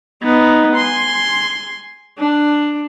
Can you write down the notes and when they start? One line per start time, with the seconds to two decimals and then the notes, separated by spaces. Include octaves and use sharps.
0.22 B3 D#4
0.75 G#5 C6
2.19 D4